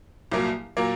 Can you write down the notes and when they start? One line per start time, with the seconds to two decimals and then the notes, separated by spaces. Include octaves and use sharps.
0.32 C2 A#2 F#3 A#3
0.77 A#2 F#3 A#3